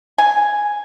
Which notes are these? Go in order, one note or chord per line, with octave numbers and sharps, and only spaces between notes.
G#5